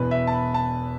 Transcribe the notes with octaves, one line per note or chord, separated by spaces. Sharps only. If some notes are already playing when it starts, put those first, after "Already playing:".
Already playing: E1 E2 B2 B4
E5
A5
B5
A5